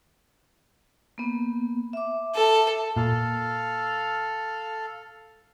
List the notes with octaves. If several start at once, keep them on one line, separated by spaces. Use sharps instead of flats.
A#3 B3
E5 D6
A4
A#2 A4 F5